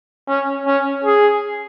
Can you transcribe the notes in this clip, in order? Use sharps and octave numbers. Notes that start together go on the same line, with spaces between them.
C#4
C#4
G#4